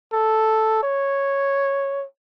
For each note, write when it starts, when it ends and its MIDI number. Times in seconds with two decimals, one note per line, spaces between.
0.13 0.83 69
0.83 2.05 73